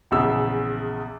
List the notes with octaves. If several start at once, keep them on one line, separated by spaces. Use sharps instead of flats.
A#1 E2 C#3 E6